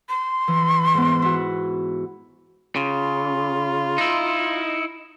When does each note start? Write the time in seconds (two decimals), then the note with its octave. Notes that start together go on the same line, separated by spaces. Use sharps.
0.09 C6
0.48 E3
0.94 G#2 B3
1.22 E4 F#4
2.76 C#3 F4
3.98 D#4 E4